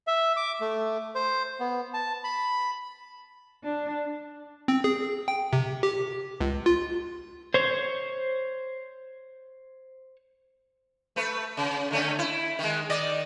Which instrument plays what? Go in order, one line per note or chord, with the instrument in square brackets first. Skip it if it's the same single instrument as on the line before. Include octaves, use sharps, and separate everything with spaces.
[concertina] E5
D6
A3
C5
B3
A5
B5
[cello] D4
[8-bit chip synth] C4
G#4
G5
C3
G4
C#2
F4
[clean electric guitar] C5 C#5
[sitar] A3 B4
C#3
D3 A3 C#4
E4
D#3 G#3
D#3 D5 D#5